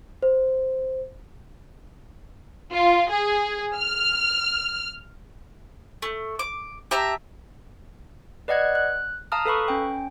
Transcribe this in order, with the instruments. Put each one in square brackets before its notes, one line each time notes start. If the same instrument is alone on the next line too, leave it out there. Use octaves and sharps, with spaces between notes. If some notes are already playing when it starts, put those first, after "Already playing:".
[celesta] C5
[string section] F4
G#4
F6
[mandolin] A3
D6
G4 E5 A5 A#5
[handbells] B4 D5 D#5 F#5 F#6 G#6
F#6
F5 A5 A#5 D#6 F6
A4 B4 F5 B5 C#6
C#4 G5